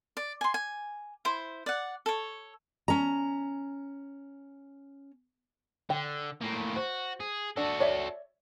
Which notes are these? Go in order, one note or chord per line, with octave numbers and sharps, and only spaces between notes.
D5
G#5 C6
G#5
E4 C5
D5 F#5
A4 C#5
C#4 A#5
D3 G5
A2 A#3
F#4 C5
G#4
D4 F#4 A4
C#5 D5 E5